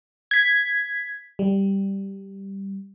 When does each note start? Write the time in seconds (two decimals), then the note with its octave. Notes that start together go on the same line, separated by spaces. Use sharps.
0.31 G#6 B6
1.39 G3